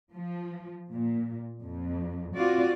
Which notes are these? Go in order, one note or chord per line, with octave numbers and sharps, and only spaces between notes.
F3
A#2
F2
C4 F4 F#4 D5